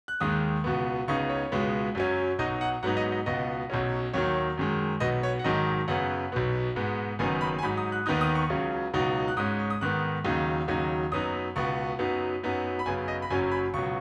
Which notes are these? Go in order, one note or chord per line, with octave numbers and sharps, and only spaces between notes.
F#6
D#2 D#3 G#3 D#6
C#2 B2 B3
C#2 C#3 B3 D#4 C#6
C#5
C#2 B2 G#3 B3
F#2 F#3 C#4
B1 B2 F#3 D#4 D#5
F#5
G#2 F#3 B3 D#4 F#5
D#5
D#5
C#2 B2 B3 D#5
B1 B2 F#3 C#4
D#2 D#3 F#3 C#5
F#2 D#3 G#3
B1 B2 B3 D#5
C#5
F#5
G#1 G#2 D#3 F#3 D#5
F#2 C#3 B3 F#5
B1 B2 B3
G#2 G#3 B3
F#1 F#2 D#3 B3 D#4 G#5
B5
G#5
G#2 F#3 D#4 B5
D#6
F#6
D#2 D#3 B3 D#4 D#6
D#6
C#6
C#2 C#3 F#3 C#4
C#2 B2 F#3 D#4
F#6
G#2 G#3 C#4 D#6
C#6
D#6
G#2 D#3 B3 F#6
D#2 C#3 F#3 D#4
D#2 C#3 F#3 D#4
F#2 F#3 B3 D#4 D#6
C#2 B2 B3 C#6
F#2 F#3 B3 D#4
F#2 F#3 B3 D#4
B5
F#2 C#3 B3 G#5
D#5
B5
F#1 F#2 F#3 C#4 G#5
B5
C#2 B2 F#3 C#6